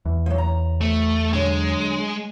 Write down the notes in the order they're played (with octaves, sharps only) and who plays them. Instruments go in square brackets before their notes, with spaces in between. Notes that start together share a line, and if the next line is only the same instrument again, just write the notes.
[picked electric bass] E2
[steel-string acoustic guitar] F3 F#3
A#5
[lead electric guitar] A3
[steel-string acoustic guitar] D3 F#3 [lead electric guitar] G#3